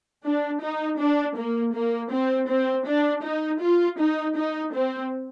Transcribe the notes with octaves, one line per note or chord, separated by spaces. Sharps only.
D4
D#4
D4
A#3
A#3
C4
C4
D4
D#4
F4
D#4
D#4
C4